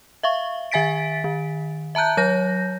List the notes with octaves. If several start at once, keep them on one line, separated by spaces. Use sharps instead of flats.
E5 F5 C#6
D#3 E5 G#5 A6 B6 D7
D#3
E5 A5 A#5 F#6 G6
F#3 C#5 G6 A#6